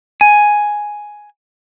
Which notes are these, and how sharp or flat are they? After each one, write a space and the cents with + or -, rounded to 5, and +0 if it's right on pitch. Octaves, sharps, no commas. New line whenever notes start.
G#5 +5